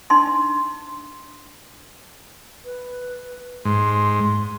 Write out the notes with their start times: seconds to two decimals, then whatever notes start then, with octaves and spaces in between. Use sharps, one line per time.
0.10 D4 D#4 C6
2.65 B4
3.65 G#2 C6